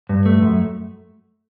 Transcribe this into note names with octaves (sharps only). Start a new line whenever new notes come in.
G2
A3
F#2